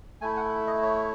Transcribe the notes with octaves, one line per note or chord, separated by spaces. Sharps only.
A3 E4 G#5
F#5
D#5
C#5